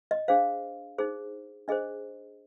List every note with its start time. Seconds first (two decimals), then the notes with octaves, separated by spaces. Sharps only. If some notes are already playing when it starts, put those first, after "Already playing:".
0.11 D#5
0.28 D4 G#4 C5 F5
0.98 D#4 G#4 C5
1.68 D4 G#4 C5 D#5